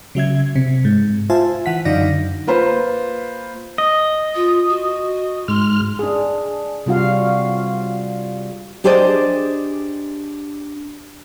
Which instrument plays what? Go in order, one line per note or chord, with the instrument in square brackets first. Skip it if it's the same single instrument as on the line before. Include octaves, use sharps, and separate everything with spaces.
[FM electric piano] C#3 F#3 E5 G#6
C3
G#2
F4 C5 E5 G#5 A5
E3 F#5 B6
F#2 D3 D#4 D5 F5 A#6
[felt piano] A#3 F4 B4 C5
[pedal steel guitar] D#5
[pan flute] F4
F#4
[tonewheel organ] G#2 F6 [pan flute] C6
[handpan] D4 G#4
C3 G3 F4 F#4 F5
[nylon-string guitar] D4 G4 G#4 C5 D5 D#5